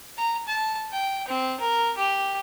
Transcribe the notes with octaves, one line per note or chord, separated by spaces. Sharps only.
A#5
A5
G5
C4
A#4
G4